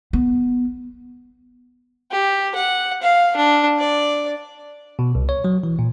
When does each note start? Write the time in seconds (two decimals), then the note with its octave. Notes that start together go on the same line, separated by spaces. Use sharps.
0.13 B3
2.12 G4
2.55 F#5
3.02 F5
3.36 D4
3.79 D5
4.99 B2
5.15 C2
5.29 C#5
5.44 F#3
5.64 E3
5.79 A#2